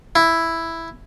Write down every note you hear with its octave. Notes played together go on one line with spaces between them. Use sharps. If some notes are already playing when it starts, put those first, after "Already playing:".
E4